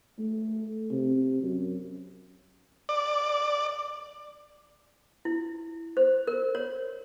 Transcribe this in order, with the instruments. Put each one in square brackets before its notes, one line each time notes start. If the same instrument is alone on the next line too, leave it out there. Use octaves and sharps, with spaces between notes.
[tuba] A3
C3
F#2
[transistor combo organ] D5
[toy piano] E4
C5
A#4
C#5